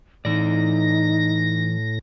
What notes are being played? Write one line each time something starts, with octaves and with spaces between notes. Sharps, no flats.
A2 E3 D#4 D5 A#6